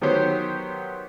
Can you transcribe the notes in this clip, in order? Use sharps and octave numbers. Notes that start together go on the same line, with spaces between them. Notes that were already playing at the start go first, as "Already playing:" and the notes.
D#3 F#3 B3 G4 C5 C#5